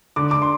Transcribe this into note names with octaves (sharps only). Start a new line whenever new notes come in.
D3 D6
D3 D6
C6